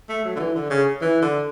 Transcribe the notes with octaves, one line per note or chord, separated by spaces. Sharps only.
A3
F#3
D3
E3
D3
C#3
E3
D3